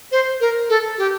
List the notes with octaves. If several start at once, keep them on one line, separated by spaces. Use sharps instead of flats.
C5
A#4
A4
G4